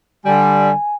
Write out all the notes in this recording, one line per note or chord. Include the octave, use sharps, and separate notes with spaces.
D3 G3 G#5